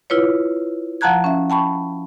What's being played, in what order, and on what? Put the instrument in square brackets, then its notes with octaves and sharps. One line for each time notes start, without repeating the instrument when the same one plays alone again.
[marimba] E4 F4 B4 C#5
F3 F#5 A5 A#5 F#6 G#6
C#4 E5
G5 A5 B5 C#6